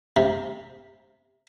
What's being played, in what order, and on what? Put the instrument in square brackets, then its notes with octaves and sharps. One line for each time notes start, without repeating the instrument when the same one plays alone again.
[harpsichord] C3